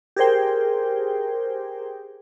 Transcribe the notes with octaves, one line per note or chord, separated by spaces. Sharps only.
G4 G#4 A#4 C5 G5